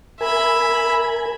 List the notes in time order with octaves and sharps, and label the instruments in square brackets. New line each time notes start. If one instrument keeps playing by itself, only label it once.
[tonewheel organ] A#4 G#5 [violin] E5 B5